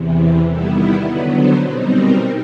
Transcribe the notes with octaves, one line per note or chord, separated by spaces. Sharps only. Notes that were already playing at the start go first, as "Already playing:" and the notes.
Already playing: E2 C3 E3
D#3 G3 B3 E4 A4
A#4
D3 F#3 B3 B4
C5
B2 G3 C4 D#4
A#4